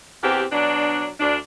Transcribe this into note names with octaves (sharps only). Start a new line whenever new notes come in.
E2 C4 G4
B2 F#3 D4
D2 D4